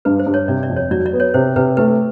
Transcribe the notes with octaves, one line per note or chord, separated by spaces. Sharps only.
G2 B4
C5
G2
C#5
C3 D5
D5
F2
C#5
F#3 D5
D5
B3
C#5
C3 C5
C3 B4
A3 B4